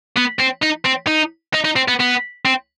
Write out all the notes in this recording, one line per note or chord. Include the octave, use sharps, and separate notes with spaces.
B3
C4
D#4
C4
D#4
D#4
D#4
C4
B3
B3
C4